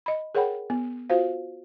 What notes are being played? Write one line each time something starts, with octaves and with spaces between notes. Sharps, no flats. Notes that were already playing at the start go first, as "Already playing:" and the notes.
D#5 B5
G#4 A#4 C#5 F#5 G5 B5
B3
F4 F#4 C5 F5